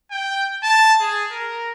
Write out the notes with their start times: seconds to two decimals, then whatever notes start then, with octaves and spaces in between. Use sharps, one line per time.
0.11 G5
0.63 A5
1.00 G#4
1.31 A#4